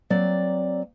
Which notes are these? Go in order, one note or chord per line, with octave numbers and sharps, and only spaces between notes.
F#3 A#3 C4 D5